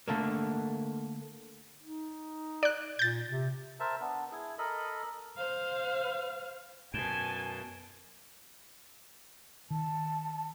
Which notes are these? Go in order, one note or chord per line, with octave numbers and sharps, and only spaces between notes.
D3 A3 A#3
D#4
D5 F#6
A#2 G6 A6
C3
A#4 C5 E5 A5
B3 D4
E4 G#4
A4 A#4 D#5 B5
C5 F5
F#2 B2 G#5 A5 D7 E7 G7
D#3 A5